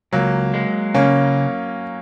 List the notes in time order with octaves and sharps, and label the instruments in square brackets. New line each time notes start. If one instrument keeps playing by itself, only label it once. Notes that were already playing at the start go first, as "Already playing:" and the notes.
[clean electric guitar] C#2 [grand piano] F#3 A#3
[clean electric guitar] G#3
[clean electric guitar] C#3 [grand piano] A#3 C#4